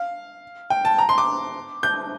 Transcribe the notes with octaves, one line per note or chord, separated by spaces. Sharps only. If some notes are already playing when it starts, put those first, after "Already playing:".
Already playing: F5
G5
A5
A#5
C6
D6
G6